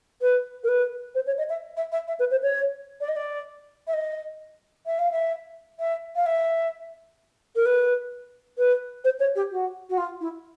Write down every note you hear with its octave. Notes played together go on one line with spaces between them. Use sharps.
B4
A#4
B4
C5
C#5
D#5
E5
E5
E5
E5
B4
C5
C#5
D5
D#5
D5
E5
D#5
E5
F5
E5
E5
F5
E5
A#4
B4
B4
C5
C#5
G4
F#4
F#4
F4
E4